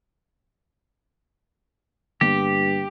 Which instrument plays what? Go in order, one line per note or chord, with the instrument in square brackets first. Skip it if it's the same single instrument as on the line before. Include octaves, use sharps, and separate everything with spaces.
[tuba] G2 [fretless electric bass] D3 A#3 B3 [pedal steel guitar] G4